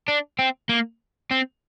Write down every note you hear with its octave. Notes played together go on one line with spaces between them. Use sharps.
D4
C4
A#3
C4